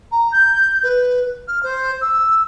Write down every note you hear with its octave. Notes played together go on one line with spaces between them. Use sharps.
A#5
G6
B4
F6
C5
E6